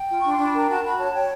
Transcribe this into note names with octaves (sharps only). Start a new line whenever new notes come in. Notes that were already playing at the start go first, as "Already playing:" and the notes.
Already playing: G5
F4
D4 C#6
C6
D4
B5
A#4 A#5
F#4 A5
F#4 B5
C#5 A5
C#5 G5